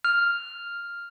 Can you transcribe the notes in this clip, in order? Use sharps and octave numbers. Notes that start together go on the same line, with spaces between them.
F6